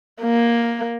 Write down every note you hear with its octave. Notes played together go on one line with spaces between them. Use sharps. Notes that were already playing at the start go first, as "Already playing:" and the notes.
A#3